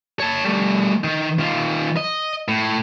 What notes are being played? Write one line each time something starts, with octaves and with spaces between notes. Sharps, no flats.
C#5 A5
G3 A3
D#3
D#3 F4
D#5
A2